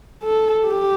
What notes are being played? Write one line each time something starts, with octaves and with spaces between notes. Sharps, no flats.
A4
G4